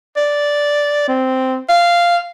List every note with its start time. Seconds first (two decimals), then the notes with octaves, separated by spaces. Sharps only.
0.16 D5
1.08 C4
1.69 F5